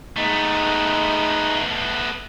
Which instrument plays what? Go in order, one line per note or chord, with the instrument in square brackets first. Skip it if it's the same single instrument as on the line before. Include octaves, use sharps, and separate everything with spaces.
[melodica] G#3 D#4 [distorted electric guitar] A3 B3